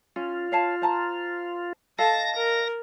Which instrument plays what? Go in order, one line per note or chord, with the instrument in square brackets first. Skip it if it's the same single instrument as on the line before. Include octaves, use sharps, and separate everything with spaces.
[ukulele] C#4 [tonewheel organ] F4
[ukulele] C#5 F5 A5
C5 A5 A#5
[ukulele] A4 D#5 F5 [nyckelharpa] A5 [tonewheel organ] A#6
[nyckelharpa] A#4